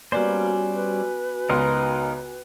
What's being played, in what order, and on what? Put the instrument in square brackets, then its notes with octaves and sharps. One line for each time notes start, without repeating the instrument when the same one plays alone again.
[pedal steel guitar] G3 C#4 C5 [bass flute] A#3 [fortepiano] B3 D5 [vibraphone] F#4 G#5
[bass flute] B4
[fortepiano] C#2 B3 C6 [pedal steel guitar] D#4 A#4